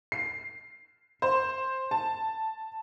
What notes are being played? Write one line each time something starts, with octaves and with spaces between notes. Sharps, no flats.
C7
C5
A5